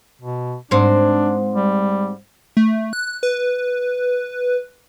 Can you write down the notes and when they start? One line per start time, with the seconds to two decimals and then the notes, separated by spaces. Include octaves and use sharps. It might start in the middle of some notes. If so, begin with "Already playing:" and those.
0.21 B2
0.71 G#2 C4 D4
1.55 G3
2.57 A3
2.93 F#6
3.23 B4